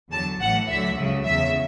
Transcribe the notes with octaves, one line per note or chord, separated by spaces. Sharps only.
E2 D3 F#3 A5
A1 A2 E3 F#5
D2 D3 F#3 E5
C#2 C#3 F#3
E2 C#3 F#3 E5